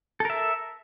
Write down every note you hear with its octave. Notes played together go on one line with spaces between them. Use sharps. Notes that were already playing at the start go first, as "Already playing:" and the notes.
A4 A#4 E5